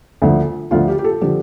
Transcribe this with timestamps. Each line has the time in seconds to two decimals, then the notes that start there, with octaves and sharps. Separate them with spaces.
0.22 D2 D3 F3
0.71 D2 D3 F3 F4
0.88 G4
0.99 G4
1.04 A4
1.21 D3 F3 G4